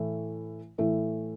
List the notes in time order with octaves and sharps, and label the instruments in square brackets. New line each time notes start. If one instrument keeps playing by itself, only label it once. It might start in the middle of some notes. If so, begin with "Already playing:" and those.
Already playing: [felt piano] A2 E3 A3
A2 E3 A3